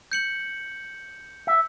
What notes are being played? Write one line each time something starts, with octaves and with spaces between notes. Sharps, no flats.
G6 C#7 F#7
E5